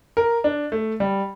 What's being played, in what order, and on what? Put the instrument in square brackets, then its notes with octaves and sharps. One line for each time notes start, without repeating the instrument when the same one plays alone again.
[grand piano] A#4
D4
A3
G3